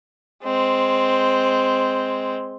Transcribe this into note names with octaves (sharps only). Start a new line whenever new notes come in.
G#3 C4